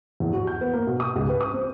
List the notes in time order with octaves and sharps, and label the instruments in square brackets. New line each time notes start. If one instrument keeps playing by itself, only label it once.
[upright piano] E2
F#4
G6
B3
A#3
B2
D#6
C#2
B4
D#6
C4